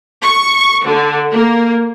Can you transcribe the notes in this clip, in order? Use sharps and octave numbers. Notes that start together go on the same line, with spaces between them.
C#6
D3
A#3